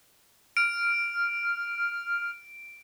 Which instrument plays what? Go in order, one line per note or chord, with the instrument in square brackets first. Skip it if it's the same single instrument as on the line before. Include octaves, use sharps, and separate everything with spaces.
[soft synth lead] F6 [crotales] D7